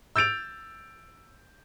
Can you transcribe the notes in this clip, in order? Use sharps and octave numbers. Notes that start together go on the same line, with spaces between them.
E6 G6 A6 D7 F7